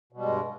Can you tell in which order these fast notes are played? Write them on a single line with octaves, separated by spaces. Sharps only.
B2 G3 G#3 G2